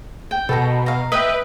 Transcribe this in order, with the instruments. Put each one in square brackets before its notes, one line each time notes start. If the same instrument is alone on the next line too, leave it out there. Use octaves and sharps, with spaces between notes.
[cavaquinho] G5
[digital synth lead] B2 [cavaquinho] A4 G5 A#5
[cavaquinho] F5 A#5
[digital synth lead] B4 [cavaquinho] D#5 E5 G5